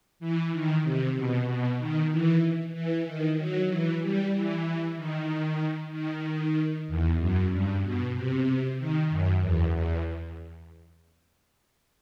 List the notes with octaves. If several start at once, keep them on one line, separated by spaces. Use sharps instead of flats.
E3
D#3
C3
B2
B2
D#3
E3
E3
D#3
F#3
E3
G3
E3
D#3
D#3
E2
F#2
G2
B2
C3
D#3
F#2
E2
E2